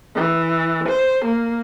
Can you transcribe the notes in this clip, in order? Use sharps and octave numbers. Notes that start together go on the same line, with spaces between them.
E3
C5
A#3